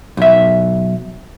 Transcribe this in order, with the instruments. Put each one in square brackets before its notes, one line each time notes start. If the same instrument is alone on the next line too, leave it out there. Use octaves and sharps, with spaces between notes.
[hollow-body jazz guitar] B1 E5